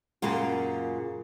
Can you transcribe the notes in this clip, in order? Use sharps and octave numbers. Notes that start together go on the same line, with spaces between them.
F#2 A#2 C#3 A#3 F4